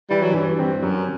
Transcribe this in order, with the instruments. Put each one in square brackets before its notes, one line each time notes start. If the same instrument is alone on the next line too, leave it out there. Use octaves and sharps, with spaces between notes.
[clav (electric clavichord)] E3 [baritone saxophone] G3
[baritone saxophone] F#3
[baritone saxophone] G2 [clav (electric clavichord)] E3
[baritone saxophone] G2 [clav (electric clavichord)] C4
[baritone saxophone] F#2 [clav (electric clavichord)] F#3